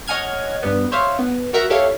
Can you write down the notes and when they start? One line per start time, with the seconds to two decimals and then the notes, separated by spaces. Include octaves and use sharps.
0.08 C#5 D#5 F#5 G#5 F6 G#6
0.63 G2 G3 B3
0.92 C5 C#5 E5 F5
1.19 B3
1.53 F#4 A#4 E5 F#5 A#5
1.70 E4 G4 A4 C#5 E5 F5